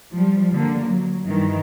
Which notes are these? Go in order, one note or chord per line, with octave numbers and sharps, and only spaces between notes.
F3 G3
D3 A#3
F#3
G2 D#3 E3